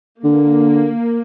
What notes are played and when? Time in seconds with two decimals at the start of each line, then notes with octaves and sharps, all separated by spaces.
0.24 D3 A#3